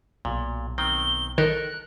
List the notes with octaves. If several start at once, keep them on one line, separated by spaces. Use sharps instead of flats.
B1 A#2
D#3 C4 G7
D#3 A4 A#4 F#6